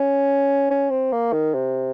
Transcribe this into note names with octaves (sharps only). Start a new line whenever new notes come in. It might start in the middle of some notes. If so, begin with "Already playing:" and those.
Already playing: C#4
C#4
C4
A#3
D#3
C3